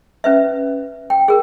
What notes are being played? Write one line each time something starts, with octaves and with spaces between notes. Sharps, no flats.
C#4 B4 E5
G5
G#4 A#4